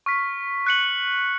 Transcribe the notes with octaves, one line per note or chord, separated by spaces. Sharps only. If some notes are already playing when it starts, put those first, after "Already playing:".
C#6 F6 B6
F#6 C#7 F#7